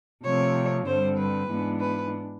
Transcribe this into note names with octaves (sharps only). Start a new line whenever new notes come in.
C3 F3 A3 C4 C#5
G2 D3 G3 C4 C5
B4
G#2 E3 G#3 B3 D4
B4